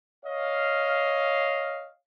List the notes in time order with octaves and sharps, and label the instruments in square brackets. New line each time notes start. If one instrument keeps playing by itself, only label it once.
[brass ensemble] C#5 D#5 F5